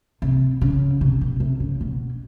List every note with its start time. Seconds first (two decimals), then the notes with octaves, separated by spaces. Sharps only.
0.22 C3
0.61 C#3
1.01 C3
1.21 B2
1.40 C3
1.60 C#3
1.81 B2